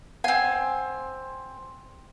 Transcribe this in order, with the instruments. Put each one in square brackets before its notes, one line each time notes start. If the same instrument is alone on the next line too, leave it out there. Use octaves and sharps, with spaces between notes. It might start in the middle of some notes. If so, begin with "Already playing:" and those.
[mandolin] C4 G#5 [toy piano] F#5